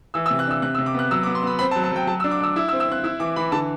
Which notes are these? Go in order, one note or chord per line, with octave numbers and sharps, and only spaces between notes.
E3 E6
E6
C3
F#6
D4 E6
C3 F#6
E6
C3
D6
B3 F#6
F#3 E6
D6
B3
C6
B3 B5
C4 B5
A5
F#3
A5
F#3 G5
F#3 A5
E6
D4
D6
D4 E6
E4 E6
E6
C4
E6
C4 F#6
E4 E6
E3 D6
E3 B5
D3 A5